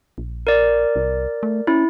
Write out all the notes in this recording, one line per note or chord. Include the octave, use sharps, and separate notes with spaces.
A#1
A#4 D5
C2
A3
C#4 E4